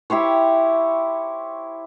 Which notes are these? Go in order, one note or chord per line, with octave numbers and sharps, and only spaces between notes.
E4 G4 C5 C#5